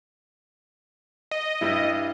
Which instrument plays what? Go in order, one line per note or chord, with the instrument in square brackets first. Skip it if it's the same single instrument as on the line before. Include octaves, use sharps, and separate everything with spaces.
[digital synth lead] D#5
[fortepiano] G2 G3 E4